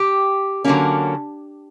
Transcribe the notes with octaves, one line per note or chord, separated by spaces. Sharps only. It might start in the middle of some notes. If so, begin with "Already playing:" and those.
Already playing: G4
D3 F#3 A#3 C#4